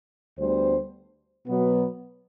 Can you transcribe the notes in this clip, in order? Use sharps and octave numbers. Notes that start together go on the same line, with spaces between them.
D2 D3 G3 B3 C5
B2 F#3 B3